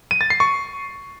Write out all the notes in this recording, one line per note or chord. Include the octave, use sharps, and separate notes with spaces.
D#7
A6
C7
C#6